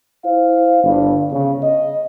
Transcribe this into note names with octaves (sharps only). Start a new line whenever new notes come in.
E4 C5 F5
G1 G2
C#3
D#5